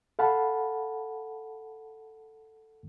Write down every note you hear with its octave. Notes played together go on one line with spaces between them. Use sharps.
A4 F5 F#5 A5 B5